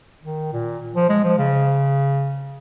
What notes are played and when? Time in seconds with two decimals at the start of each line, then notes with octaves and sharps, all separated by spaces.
0.23 D#3
0.53 A#2
0.96 F3
1.09 G#3
1.24 F3
1.39 C#3